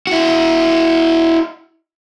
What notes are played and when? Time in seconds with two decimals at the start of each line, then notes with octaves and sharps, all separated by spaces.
0.07 E4 F#4